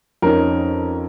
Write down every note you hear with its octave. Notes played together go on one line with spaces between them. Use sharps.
F2 C#4 D#4 A#4